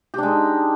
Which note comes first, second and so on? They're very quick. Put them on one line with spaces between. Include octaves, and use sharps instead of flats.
G4 D4 G#3 D#4